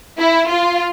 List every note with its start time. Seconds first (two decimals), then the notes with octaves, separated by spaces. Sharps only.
0.20 E4
0.51 F4